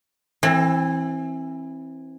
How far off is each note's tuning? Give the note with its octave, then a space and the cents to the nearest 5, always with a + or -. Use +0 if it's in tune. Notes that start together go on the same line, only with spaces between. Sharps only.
E3 +0 C4 +30